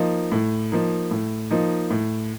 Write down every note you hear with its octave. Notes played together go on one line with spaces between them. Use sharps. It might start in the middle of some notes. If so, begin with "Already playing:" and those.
Already playing: F3 A#3 D#4
A2
F3 A#3 D#4
A2
F3 A#3 D#4
A2